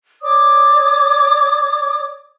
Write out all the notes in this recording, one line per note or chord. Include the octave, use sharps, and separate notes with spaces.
C#5 D5 D6 D#6